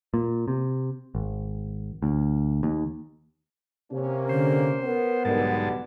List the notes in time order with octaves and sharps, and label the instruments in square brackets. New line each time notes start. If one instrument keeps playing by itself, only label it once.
[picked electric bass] A#2
C3
G#1
D2
D#2
[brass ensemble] C3 A#3 C#4
[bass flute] D3 [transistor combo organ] C5
[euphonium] B3 [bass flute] A#4
[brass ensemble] B1 D3 G3 [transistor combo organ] G#2 A5